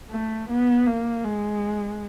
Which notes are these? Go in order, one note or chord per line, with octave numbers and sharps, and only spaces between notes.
A3
B3
A#3
G#3